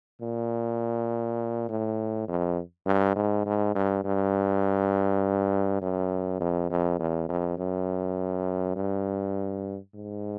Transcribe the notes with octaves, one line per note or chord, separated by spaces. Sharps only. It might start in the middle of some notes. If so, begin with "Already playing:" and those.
A#2
A2
F2
G2
G#2
G#2
G2
G2
F#2
F2
F2
E2
F2
F#2
G2
G#2